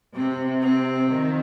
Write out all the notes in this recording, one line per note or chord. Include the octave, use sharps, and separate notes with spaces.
C3 C4
C4
D#3 F3